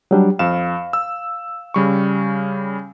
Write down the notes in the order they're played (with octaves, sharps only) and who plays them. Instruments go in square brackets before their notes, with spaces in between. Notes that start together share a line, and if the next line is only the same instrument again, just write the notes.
[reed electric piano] F#3 G3 D4
[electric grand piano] F2 E7 [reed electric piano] F5
[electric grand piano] E6
C#3 G3 C#6